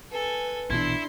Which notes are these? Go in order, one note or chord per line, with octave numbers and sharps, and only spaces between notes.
A4 B4 G#5
A#1 B2 E3 D4 E4 C6